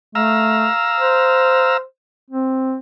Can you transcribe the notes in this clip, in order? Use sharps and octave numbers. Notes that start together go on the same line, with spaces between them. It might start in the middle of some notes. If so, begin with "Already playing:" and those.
A3 F5 A#5 E6
C5
C4